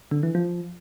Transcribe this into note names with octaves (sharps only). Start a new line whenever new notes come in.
D3
E3
F3